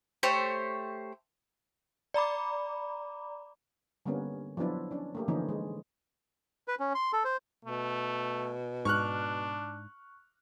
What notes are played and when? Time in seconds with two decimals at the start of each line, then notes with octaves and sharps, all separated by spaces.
0.23 A3 G4 C5 C#5
2.14 D5 A#5 B5 D6
4.06 D3 G3 A#3 B3 C#4
4.57 F3 F#3 B3 D4 E4
4.91 C#4 D4
5.15 A3 A#3 G4
5.28 D3 E3 F3 A#3 C#4 D#4
5.49 G#3
6.68 B4
6.80 C#4
6.95 C6
7.13 A4
7.25 C5
7.65 B2 A3
8.85 G#2 D4 C#6 F6 F#6